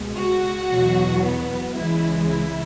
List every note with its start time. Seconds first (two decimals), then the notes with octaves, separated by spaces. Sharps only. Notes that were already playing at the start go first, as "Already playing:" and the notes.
Already playing: C#2 B2 G#3
0.16 F#4
0.69 E2 B2 F#3
1.24 B3
1.76 C#2 C#3 E3 G#3 E4
2.30 E4